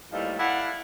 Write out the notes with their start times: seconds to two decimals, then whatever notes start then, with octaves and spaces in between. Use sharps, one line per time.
0.13 A2 F3 G3 A#3 D#4 A4
0.39 E4 A4 D5 F5 F#5